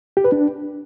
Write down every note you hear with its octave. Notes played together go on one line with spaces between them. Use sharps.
G4
B4
D4